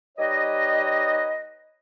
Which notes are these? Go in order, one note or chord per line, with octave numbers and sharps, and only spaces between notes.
G3 D#4 B4 C#5 D#5